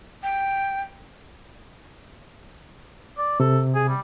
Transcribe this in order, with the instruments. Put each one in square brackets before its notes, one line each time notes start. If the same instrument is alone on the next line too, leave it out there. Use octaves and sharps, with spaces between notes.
[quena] G5
[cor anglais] D5
[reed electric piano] C3 [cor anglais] A4
[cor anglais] G#4
G3